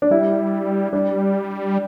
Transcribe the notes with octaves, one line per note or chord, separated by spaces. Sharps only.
D4
G3 E4
G3 D4